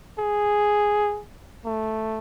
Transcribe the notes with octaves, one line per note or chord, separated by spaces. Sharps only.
G#4
A3